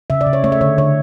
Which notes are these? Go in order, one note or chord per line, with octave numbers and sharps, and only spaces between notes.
C#3 E5
D5
C#3
C#5
A3 C#5
E5
D3 C#5
D3 C#5